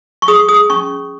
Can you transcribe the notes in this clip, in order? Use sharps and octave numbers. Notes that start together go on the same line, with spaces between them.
C#6
G#4 D#6
G#4 D#6
C#4 C#6
C#4